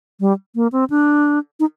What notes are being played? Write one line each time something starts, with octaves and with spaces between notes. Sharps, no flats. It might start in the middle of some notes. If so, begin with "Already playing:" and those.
G3
A#3
C4
D4
D#4